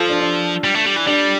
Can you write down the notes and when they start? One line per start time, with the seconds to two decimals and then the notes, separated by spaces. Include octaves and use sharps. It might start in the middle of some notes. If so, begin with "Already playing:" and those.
Already playing: F3 F4 A4
0.09 D4
0.20 D4
0.64 G3
0.75 A3
0.86 G3
0.96 E3
1.07 G3 D4